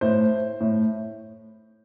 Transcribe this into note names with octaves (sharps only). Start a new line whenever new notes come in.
A2 C5
A2